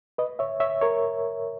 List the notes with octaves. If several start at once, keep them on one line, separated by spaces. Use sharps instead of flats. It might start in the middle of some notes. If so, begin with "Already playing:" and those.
B4 D#5
C#5 E5
C#5 E5
A#4 C#5